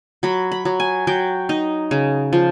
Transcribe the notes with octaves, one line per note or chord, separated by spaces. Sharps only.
F#3 B5
B5
F#3
G#5
F#3 G5
D#4
C#3
F3